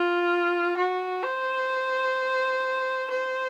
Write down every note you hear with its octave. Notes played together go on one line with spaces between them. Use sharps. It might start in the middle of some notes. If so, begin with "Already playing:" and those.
Already playing: F4
F#4
C5
C5